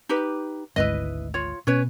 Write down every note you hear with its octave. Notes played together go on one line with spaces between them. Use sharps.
D#4 G4 B4
G#1 D2 G#2 E4 B4 D#5
F4 C#5
B2 C#4 B4 C#5